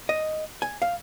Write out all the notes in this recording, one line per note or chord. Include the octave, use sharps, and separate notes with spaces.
D#5
G#5
F5